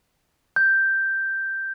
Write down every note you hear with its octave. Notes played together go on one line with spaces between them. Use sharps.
G6